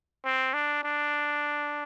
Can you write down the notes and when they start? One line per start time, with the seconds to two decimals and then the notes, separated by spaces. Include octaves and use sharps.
0.25 C4
0.53 D4
0.84 D4